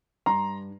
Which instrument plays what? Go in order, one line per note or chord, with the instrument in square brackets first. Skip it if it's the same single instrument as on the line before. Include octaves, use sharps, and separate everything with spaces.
[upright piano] G2 A#5 C6